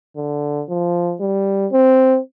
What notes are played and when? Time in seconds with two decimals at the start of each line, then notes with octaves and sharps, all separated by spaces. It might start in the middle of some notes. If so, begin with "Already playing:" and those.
0.17 D3
0.69 F3
1.21 G3
1.72 C4